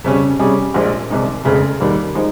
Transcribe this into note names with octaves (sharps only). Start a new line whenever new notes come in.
F2 C#3 G3 C#4
C3 G3 C#4 G#4
A#1 A#2 F3 G#3
C2 C3 D#3 G#3 D#4
F1 F2 C#3 G#3
D#2 D#3 G3 A#3
F3 G#3 D#4